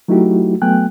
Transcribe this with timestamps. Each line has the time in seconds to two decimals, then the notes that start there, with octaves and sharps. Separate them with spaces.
0.08 F#3 A3 D#4 E4 F#4 G4
0.62 F#3 A3 B3 G5 G#5 F#6